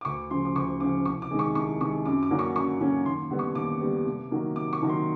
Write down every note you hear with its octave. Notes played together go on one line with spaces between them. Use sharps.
D6
D2 C#6
C#3 F3 C6
D6
D2 C#6
C#3 F3 D6
C2 C#6
D6
C3 D#3 G#3
C#6
C2 C#6
C3 D#3 G#3 C#6
F#2 D6
D6
D3 F#3 A#3 C#4
C#6
F#2 C#6
D3 F#3 A#3 C#4
D#2 C6
D3 G3 B3
C#6
D#2 D6
D3 G3 B3
C3
D#3 F#3 A#3
C3 D6
C#6
D#3 F#3 A#3
C6